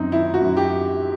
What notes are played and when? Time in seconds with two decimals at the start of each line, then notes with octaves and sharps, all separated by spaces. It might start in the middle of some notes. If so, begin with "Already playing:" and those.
Already playing: F#2 C4 D#4
0.12 D#3 E4
0.34 F#4
0.41 F#2
0.57 G4